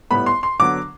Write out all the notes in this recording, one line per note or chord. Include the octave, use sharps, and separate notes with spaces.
A2 G3 B3 B5
C6
C6
D3 F#3 B3 D6